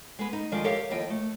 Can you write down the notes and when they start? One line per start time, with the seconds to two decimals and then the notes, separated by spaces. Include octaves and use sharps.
0.19 G#3 B3 B4
0.33 D#4
0.52 D3 D#3 F3 G#3 F4 D5
0.64 G4 A4 A#4 C#5 E5 F5
0.90 D#2 F3 E4 D#5 G5
1.10 A3